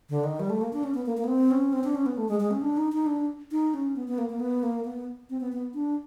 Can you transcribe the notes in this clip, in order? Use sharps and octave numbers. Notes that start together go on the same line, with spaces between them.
D3
D#3
G3
A3
A#3
D4
C#4
B3
A#3
A#3
B3
C4
C#4
C4
D4
C#4
B3
A3
G#3
G#3
C#4
D4
D#4
D#4
D4
D#4
C#4
B3
B3
A#3
A#3
B3
A#3
B3
C4
B3
B3
D4